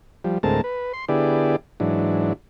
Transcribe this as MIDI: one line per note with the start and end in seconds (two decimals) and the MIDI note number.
0.24 0.38 53
0.24 0.38 55
0.43 0.61 38
0.43 0.61 45
0.43 0.61 56
0.43 0.61 60
0.43 0.61 70
0.43 0.61 81
0.64 0.92 71
0.93 1.05 84
1.09 1.56 50
1.09 1.56 59
1.09 1.56 64
1.09 1.56 67
1.09 1.56 68
1.09 1.56 74
1.80 2.33 44
1.80 2.33 52
1.80 2.33 54
1.80 2.33 62